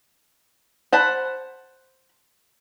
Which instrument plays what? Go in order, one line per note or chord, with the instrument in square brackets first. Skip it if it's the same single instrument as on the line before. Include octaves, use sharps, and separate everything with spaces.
[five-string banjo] C5 F#5 A5 B5